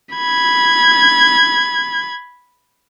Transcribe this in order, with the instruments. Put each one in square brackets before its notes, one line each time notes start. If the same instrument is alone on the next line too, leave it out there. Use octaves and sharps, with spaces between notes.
[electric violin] B5 G#6